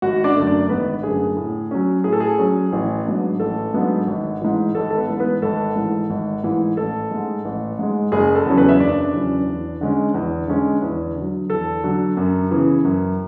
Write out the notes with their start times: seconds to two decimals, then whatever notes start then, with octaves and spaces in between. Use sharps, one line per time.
0.02 G#1 F#4 F#5
0.24 D4 D5
0.36 F#2 D3 A3
0.47 D4 D5
0.69 G#1 B3 B4
1.03 F#2 D3 A3 G#4
1.37 A2
1.71 F#3 C#4
2.04 A2 G#4
2.13 A4
2.20 G#4
2.39 F#3 C#4
2.72 A1
3.06 G#2 F#3 B3 D4
3.40 A1 A4
3.74 G#2 F#3 B3 D4
4.07 G#1
4.42 G#2 E3
4.75 G#1 A4
4.90 A4
4.97 B3 B4
5.09 G#2 E3
5.20 B3 B4
5.42 G#1 A4
5.76 G#2 E3
6.10 G#1
6.44 G#2 E3
6.77 A1 A4
7.11 G#2 G#3
7.45 A1
7.79 G#2 G#3
8.12 F#1 G#4
8.35 A4
8.46 E2 C#3 F#3 C#4
8.57 B3 B4
8.68 E5
8.80 F#1 D4 D5
9.13 E2 C#3 F#3 C#4
9.47 E2
9.81 D3 G#3 C#4
10.14 E2
10.48 D3 G#3 C#4
10.82 E2
11.16 D3 F#3
11.50 E2 A4
11.84 D3 F#3
12.17 F#2
12.51 C#3 E3 B3
12.85 F#2